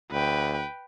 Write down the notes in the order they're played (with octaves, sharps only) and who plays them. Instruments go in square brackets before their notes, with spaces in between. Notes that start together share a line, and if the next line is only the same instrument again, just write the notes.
[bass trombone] D2 [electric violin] B4 G5